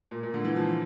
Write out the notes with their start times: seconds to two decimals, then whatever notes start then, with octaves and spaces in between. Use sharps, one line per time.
0.11 A#2
0.23 A#2
0.34 D3
0.45 E3
0.56 F3